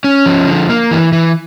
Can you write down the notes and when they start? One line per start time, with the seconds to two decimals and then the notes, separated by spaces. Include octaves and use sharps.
0.04 C#4
0.26 F3
0.47 D3
0.69 A#3
0.91 E3
1.13 E3